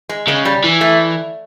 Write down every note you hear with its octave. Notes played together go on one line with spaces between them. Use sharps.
G#3
C#3 G#3
G3
E3
A3